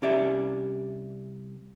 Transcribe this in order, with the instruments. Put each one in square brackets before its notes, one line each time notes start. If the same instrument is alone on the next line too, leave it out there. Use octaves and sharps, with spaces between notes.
[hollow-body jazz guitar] C2 C#4 G4 D5 E5